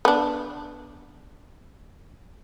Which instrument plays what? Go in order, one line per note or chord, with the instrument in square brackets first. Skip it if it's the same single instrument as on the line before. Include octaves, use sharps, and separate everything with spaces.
[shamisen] B3 D4